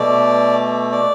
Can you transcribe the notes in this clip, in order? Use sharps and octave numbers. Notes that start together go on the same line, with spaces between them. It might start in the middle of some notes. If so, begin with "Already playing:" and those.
Already playing: B2 A3 D5
D5